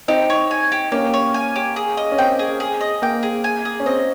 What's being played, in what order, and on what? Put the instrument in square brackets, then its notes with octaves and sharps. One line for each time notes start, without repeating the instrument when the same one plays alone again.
[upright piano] C4 D#4 [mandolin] G4
[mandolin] C#5
G#5
G4
[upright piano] A#3 C#4 [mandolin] G4
[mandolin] C#5
G#5
G4
G#4
D#5
[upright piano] C#4
[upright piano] C4 [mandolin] G5
[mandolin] G#4
G#4
D#5
[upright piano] A#3 [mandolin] G5
[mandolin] G#4
G#5
G#4
[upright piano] C#4
[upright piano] C4 [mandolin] D#5